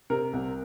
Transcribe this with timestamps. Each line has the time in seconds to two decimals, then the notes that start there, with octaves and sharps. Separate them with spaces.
0.10 C3 A#4
0.33 C2